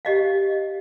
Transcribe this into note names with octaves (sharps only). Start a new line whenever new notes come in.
G4 D#5 F5